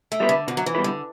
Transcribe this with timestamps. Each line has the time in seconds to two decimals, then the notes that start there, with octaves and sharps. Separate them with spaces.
0.12 A3
0.20 G3 B3 E4 B4
0.29 D3
0.47 B2 D3
0.57 F#3
0.66 E3
0.75 G3 B3 E4 B4
0.84 D3